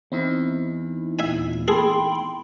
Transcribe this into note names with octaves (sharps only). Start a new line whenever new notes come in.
E2 C4 D#4 E4
D#2 A#2 E5 G#5
G#4 A4 G5 B5 C6